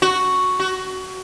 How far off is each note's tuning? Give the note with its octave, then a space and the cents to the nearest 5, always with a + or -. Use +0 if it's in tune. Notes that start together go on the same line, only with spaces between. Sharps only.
F#4 +0
F#4 +20